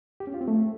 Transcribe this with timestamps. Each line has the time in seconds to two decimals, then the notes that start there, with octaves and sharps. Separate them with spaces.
0.20 G4
0.27 C#4
0.34 F4
0.41 C4
0.48 A3